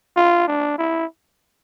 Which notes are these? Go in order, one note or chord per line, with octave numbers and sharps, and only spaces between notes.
F4
D4
E4